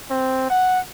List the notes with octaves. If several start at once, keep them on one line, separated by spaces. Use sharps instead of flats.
C4
F#5